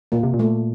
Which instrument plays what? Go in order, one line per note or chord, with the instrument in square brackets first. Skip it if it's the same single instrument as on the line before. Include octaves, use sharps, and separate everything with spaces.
[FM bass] A#2 [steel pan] A#3
[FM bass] C3
A#2
[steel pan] A3